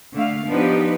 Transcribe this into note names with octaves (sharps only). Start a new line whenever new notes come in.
D3 A3 F5
F3 B3 D4 D#4 G4 B4